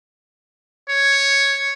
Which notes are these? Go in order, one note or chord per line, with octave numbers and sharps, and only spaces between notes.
C#5